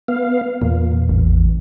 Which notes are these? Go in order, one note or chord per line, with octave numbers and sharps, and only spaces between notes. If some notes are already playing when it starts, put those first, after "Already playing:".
B3 F5
E2 A#2
A1